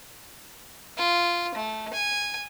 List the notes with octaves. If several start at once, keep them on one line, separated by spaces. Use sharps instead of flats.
F4
A3
G#5